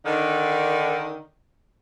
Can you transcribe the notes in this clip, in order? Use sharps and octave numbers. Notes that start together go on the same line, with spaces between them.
D3 D#3